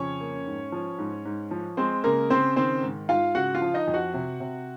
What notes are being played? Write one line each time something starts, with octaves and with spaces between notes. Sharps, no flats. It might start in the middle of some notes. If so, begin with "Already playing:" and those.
Already playing: F2 C#3 C#4 C#5
A#3
G#2
F3
G#2
G#2
F3
G#3 C4 C5
C#3 A#3 A#4
C#3 C4 C5
D#3 C4 C5
G#2
G#2 F4 F5
C#3 F#4 F#5
F4 F5
F3
D#4 D#5
F2
F#4 F#5
C3
C3